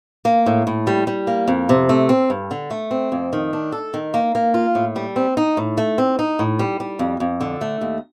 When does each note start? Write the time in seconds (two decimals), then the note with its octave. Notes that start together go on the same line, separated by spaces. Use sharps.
0.25 A#3
0.46 A2
0.67 A2
0.87 G3
1.07 G3
1.27 A#3
1.48 F2
1.69 C3
1.89 A3
2.09 C4
2.30 G2
2.51 D3
2.71 A3
2.91 C4
3.12 F2
3.33 D#3
3.53 D4
3.72 A4
3.94 D#3
4.14 A#3
4.35 A#3
4.54 F4
4.75 A2
4.96 G3
5.16 C4
5.37 D#4
5.57 A2
5.78 A3
5.98 C4
6.19 D#4
6.39 A2
6.59 G3
6.80 G3
6.99 F2
7.20 F2
7.41 D3
7.61 A3
7.81 D#2